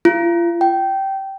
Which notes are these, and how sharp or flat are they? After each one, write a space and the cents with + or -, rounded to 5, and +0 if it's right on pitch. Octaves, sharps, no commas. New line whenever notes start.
F4 -40
G5 -15